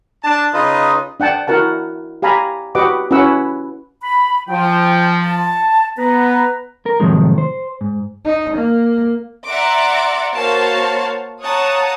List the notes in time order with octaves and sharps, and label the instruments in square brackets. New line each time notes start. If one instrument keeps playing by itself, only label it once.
[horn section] D4 A5
[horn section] C#3 D#5 [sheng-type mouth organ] D#4 F4 B4
[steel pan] D4 F#5 G5 A5
E4 F#4 A#4 F#5 A5
G4 F5 G#5 A#5 B5
F#4 G4 B4 D#5 F#5 D6
C#4 E4 F#4 B4 F#5 E6
[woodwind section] B5
[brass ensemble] F3 [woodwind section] G5
[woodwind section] A5
[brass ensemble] B3 [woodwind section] B4 A#5
[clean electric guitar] A#4
A2 C3 D#3 F3 F#3 G#3
C5
G#2
[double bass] D#4
A#3
[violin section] D5 E5 F#5 A#5 C6 D6
A#3 F#4 C5 C#5 F5 A5
C#5 F5 F#5 A5 A#5 D#6